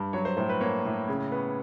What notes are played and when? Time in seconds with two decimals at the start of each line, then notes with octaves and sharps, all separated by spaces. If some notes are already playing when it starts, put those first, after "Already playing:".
Already playing: G2
0.13 F#3 C#5
0.25 C5
0.37 A2 C5
0.49 B4
0.61 A#3 C#5
0.85 A2
1.08 C#3
1.32 B3